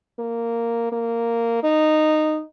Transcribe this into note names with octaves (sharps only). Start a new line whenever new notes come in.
A#3
A#3
D#4